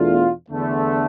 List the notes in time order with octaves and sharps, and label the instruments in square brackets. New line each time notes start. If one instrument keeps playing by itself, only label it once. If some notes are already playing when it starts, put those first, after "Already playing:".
Already playing: [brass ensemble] E2 B2 A3 D4 F4
E2 D3 A3